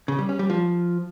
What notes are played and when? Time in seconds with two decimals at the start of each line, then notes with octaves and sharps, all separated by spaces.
0.08 C#3
0.19 G3
0.29 C#4
0.39 G3
0.50 F3